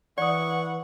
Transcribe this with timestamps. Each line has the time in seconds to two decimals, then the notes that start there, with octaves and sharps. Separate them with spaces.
0.18 E3 D5 F#5 C#6 D#6